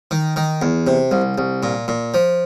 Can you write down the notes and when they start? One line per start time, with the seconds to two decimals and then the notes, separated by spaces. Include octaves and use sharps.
0.11 D#3
0.36 D#3
0.62 E2
0.87 C3
1.11 C2
1.38 C2
1.63 A#2
1.88 A#2
2.14 F3